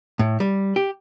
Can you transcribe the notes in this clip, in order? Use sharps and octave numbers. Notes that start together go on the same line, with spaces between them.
A2
G3
G4